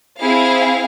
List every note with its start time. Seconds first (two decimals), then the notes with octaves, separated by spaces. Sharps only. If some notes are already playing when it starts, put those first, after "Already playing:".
0.19 C4 E4 G#4 F5